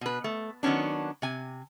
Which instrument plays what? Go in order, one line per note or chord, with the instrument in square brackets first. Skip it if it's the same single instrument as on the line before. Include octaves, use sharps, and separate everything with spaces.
[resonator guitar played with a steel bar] B2 B4
A3
D#3 F#3 B3 C#4 D4
C3 G#5